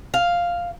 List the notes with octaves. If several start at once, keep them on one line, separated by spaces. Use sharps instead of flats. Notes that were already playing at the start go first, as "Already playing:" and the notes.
F5